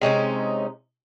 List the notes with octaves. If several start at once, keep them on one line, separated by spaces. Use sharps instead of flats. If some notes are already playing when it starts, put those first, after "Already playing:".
C3 G#3 C#4 D#4